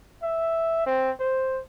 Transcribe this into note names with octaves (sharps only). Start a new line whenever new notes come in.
E5
C4
C5